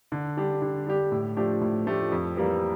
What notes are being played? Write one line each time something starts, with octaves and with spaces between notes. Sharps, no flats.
D3
G3 D4 G4
D3
G3 D4 G4
A2
F3 A3 D4 G4
A2
F3 A3 D4 G4
F2
E3 G3 A#3